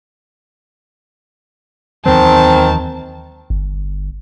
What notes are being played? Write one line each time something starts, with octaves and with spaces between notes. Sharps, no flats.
D#2 D#3 E3 F#3 G#3 C4 A5
G1